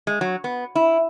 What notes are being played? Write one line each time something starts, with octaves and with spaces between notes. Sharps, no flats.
G#3
F#3
B3
E4